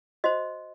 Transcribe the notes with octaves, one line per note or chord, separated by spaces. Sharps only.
F#4 C5 D#5